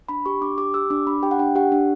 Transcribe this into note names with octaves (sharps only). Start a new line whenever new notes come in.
D4 B5
G4 C#6
D4 D6
G4 D6
G4 E6
D4 D6
D4 B5
G4 G5
F#5
D4 G5
G4 F#5
D4